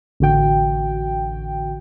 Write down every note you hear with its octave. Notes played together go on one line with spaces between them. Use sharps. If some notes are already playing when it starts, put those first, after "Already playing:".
A1 D3 F#4 G5